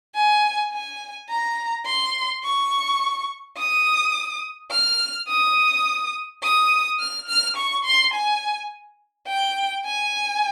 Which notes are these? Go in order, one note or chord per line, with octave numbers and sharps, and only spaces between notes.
G#5
G#5
A#5
C6
C#6
D#6
F6
D#6
D#6
F6
F6
C#6
C6
G#5
G5
G#5